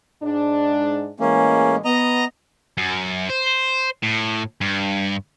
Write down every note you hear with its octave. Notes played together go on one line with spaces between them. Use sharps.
G#2 D4
A2 E3 G#3 A#3 C#4
B3 D#5 A#5
F#2
C5
A2
G2